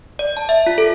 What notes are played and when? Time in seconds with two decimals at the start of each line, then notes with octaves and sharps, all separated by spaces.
0.19 D5
0.37 A5
0.49 E5
0.67 F4
0.78 A4